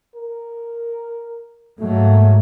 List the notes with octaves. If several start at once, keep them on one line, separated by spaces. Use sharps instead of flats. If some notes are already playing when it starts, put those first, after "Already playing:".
A#4
G#2 F#3 A3 A#3